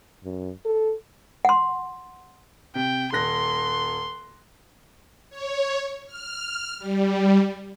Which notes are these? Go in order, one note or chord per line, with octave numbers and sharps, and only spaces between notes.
F#2
A4
F#5 C6
C3 G5
D#1 C6 F#6 A#6
C#5
F6
G3